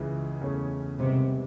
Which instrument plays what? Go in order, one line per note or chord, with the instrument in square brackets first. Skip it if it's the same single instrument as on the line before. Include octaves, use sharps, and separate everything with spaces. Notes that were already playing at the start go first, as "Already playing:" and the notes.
Already playing: [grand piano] C#2 C#3 E3
E2 C#3 E3 A3 C#4
[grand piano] G#2 D#3 G3 B3 [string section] C3